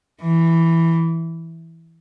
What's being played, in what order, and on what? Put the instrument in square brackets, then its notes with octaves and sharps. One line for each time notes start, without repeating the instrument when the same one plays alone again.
[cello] E3